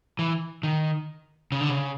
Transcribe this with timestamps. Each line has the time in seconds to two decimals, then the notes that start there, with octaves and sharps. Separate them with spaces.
0.19 E3
0.63 D#3
1.52 C#3
1.61 D3
1.69 C#3